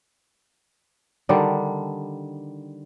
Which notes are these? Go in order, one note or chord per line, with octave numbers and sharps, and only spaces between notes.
D3 D#3 G3 D4